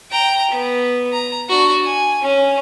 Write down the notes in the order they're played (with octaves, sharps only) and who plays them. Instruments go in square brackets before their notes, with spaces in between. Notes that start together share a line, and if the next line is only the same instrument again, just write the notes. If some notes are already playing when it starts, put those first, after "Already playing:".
[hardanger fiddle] G5 A#5
B3
A#5
D4 F#4
G#5
C#4